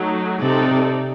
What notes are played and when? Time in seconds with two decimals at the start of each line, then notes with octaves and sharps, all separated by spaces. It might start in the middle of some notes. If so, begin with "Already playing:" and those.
Already playing: F#3 A3 D#4
0.39 C3 C4 D#4 A4 D5